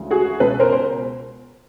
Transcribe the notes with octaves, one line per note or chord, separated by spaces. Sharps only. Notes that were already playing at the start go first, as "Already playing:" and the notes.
Already playing: D2 C#3 E3 G#3
F#4 G#4
C#2 B2 G#3 A4 B4
A#4 C5
C5